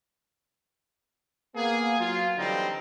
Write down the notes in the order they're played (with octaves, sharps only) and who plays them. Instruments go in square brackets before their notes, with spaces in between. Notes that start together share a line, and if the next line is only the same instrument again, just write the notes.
[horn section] A#3 B3 G#4
F#3 F4
D3 E3 F#3 G3 C4 D#4